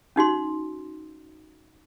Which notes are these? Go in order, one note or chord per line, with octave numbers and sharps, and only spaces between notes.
C#4 D#4 F#4 C6